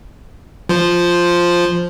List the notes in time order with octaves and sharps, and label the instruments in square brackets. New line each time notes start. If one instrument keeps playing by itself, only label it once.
[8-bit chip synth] F3 C5